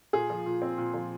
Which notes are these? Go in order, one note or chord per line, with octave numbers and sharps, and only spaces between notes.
A#2 G#4
F3
A#2
C4
A#2
F3